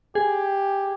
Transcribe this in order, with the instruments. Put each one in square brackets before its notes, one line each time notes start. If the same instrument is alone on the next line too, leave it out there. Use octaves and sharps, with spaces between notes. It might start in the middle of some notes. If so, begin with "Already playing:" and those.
[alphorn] G4 [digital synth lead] G#4